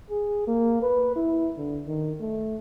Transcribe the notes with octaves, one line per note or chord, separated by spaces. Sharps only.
G#4
A#3
B4
E4
D3
D#3
A3